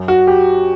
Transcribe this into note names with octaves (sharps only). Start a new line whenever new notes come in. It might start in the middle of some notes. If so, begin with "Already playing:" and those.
Already playing: F#2
F#4
G4